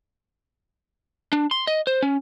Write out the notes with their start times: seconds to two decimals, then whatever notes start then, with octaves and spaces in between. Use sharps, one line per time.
1.33 D4
1.51 C6
1.67 D#5
1.87 C5
2.02 C#4